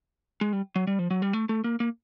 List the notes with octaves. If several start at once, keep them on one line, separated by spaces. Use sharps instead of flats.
G#3
G3
F#3
G3
F3
F#3
G3
A3
A3
A#3
A#3